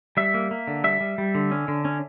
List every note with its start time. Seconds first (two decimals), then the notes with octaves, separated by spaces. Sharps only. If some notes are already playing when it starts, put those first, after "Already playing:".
0.17 G3 E5
0.34 A#3
0.51 A#3
0.68 D3
0.84 G3 E5
1.01 G3
1.18 G3
1.35 D3
1.51 C#4
1.68 D3
1.85 C#4